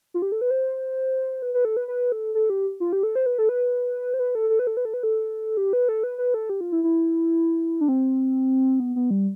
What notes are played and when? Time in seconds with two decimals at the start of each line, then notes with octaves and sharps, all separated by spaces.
0.14 F4
0.22 G4
0.32 A4
0.41 B4
0.51 C5
1.42 B4
1.54 B4
1.65 A4
1.77 B4
1.88 B4
2.12 A4
2.35 A4
2.50 G4
2.80 F4
2.93 G4
3.03 A4
3.15 C5
3.26 B4
3.38 A4
3.49 B4
4.14 C5
4.19 B4
4.35 A4
4.49 A4
4.59 B4
4.67 A4
4.77 B4
4.85 A4
4.94 B4
5.03 A4
5.57 G4
5.73 B4
5.89 A4
6.03 B4
6.18 B4
6.34 A4
6.50 G4
6.61 F4
6.72 E4
6.84 E4
7.81 D4
7.88 C4
8.80 B3
8.96 B3
9.11 G3